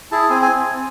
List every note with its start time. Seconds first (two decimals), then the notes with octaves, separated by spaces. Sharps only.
0.11 E4 G#4 A5
0.30 C4 G#5
0.42 G#5